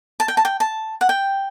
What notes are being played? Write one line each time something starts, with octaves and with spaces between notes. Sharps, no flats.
A5
G5
A5
G5
A5
F#5
G5